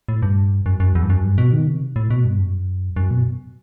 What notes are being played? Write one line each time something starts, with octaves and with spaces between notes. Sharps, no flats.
A2
G2
F#2
F#2
E2
G2
F#2
G2
B2
D#3
C3
A2
B2
G2
F#2
F#2
B2